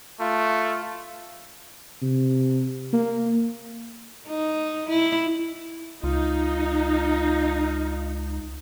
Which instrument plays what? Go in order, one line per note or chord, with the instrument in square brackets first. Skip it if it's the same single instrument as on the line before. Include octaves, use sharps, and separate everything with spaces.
[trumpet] A3 [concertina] F4
[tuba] C3
A#3
[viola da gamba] D#4
E4
[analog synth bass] C#2 [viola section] D#4 [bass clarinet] F4